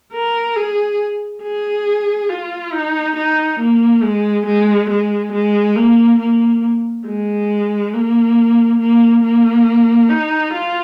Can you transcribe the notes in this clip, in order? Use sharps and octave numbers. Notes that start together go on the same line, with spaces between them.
A#4
G#4
G#4
F4
D#4
D#4
A#3
G#3
G#3
G#3
G#3
A#3
A#3
G#3
A#3
A#3
A#3
D#4
F4